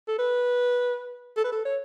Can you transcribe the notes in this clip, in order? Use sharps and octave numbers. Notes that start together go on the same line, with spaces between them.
A4
B4
A4
B4
A4
C#5